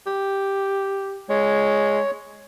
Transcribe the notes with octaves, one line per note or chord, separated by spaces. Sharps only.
G4
G#3 C#5